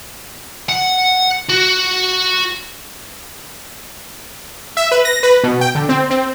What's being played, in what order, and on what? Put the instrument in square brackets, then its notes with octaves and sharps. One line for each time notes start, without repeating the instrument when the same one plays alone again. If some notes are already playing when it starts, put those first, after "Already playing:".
[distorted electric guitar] F#5
F#4
[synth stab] E5
B4
A#6
B4
B2
G5
D3
C4
C4